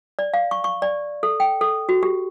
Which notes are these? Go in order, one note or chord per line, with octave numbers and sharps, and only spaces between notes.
D5
F5
C#6
C#6
D5
A4
G5
A4
F#4
G4